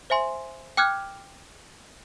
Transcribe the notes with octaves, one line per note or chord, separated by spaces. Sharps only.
C5 E5 G#5 C6
G5 D6 F6 F#6 G#6